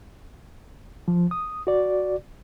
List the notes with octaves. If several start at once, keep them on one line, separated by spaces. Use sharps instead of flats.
F3
D#6
F#4 D5